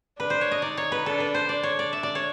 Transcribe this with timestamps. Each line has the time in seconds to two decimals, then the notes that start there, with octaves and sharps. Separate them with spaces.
0.19 D4 B4
0.30 C5
0.41 C#5
0.51 D#5
0.62 D#4 D5
0.77 C#5
0.92 B4
1.06 D4 A4
1.20 B4
1.34 C5
1.49 D4 D5
1.63 C#5
1.79 D5
1.93 E5
2.03 D5
2.15 C#5